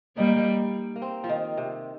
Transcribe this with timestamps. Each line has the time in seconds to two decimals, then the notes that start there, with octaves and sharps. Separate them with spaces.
0.17 G3 A#3 D#4
0.96 A#3
1.02 C4
1.24 F3
1.29 D#3
1.57 C3